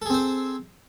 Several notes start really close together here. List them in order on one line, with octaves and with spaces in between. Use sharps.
A4 G#4 C4 C5